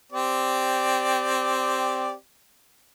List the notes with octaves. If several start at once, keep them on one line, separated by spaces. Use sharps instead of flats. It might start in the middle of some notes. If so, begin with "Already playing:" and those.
C4 G4 D5